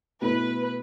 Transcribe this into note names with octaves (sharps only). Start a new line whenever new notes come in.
B2 A3 E4 A4 B4